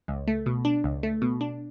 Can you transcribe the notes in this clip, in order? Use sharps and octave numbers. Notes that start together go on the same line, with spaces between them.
C#2
A3
B2
D4
C#2
A3
B2
D4